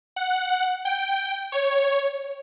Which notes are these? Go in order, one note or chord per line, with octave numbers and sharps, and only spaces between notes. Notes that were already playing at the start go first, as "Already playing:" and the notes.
F#5
G5
C#5